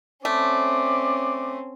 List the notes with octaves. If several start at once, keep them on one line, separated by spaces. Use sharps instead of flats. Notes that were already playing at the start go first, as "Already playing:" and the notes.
A3 C4 C#4 D5